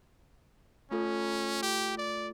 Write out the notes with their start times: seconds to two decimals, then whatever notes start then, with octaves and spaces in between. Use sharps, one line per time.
0.91 A3 C#4 F4 A4
1.63 G4
1.98 D5